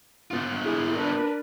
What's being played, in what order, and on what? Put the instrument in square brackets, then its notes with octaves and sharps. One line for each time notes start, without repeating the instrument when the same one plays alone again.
[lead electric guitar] B3 F4
[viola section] E4 G#4
D4 A#4 B4